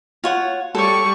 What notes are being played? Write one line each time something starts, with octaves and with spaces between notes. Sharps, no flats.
F4 C#5 F#5
G3 A4 C#5 C#6